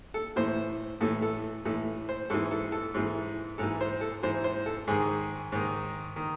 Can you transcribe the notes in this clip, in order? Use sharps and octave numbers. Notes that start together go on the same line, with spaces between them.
A4
A2 E3 C5
A2 E3 A4
A4
A2 E3 A4
C5
G#2 E3 A4
A4
A4
G#2 E3
G#2 E3 A4
C5
A4
G#2 E3 C5
C5
A4
G#2 D#3 G#4
G#2 D#3
D#3